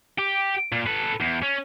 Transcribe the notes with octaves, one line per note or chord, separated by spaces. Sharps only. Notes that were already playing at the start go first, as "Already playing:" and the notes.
G4
A#2
A4 B4
E2
C#4